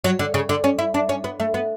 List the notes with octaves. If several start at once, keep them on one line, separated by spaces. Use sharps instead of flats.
F#3
D3
C#3
D3
C#4
E4
D4
C#4
B3
A3
B3